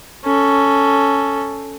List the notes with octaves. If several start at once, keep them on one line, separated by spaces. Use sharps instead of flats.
C#4 A4